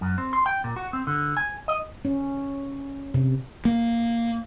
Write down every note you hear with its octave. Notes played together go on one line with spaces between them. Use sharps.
F#2
C4
C6
G5
A#2
F#4
C4
D3
G#5
D#5
C#4
C3
A#3